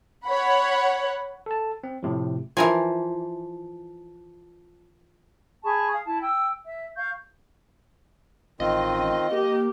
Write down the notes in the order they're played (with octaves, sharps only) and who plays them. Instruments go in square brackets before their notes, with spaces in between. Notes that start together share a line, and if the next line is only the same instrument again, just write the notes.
[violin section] C#5 F#5 B5
[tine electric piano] A4 A5
C4
A2 C3 F3
[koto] E3 A#4 G#5 [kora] F3
[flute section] G#4 A5 B5 C#6
F5 G#5 D#6
E4 A5
G5 E6
E5
F5 C#6 G6
[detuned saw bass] A1 [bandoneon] D#3 C4 F4 [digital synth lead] D#5
[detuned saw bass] A#3 [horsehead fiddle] G4